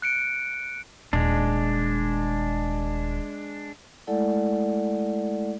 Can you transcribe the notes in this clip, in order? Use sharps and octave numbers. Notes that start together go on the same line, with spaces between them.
F#6 C#7 D7
D#1 G#3 D4
G#3 A3 E4 A4 D5 F#5